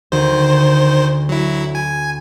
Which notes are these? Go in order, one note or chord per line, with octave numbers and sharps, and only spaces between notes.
D2 D#3 C5
F#3 E4
G#5